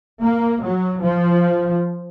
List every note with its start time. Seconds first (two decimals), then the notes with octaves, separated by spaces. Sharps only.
0.24 A#3
0.63 F#3
1.02 F3